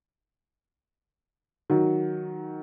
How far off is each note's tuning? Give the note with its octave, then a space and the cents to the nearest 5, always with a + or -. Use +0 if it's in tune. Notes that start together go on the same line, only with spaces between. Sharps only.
D#3 +0 F#3 +0